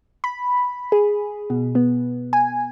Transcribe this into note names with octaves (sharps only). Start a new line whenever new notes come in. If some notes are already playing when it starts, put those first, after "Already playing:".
B5
G#4
B2
B3
G#5